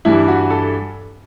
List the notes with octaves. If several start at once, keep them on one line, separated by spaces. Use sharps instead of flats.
G2 E3 G3 E4
F#4
A4